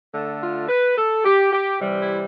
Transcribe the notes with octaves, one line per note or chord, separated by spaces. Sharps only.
D3 A3
F4
B4
A4
G4
G4
C3 E3 G3
E4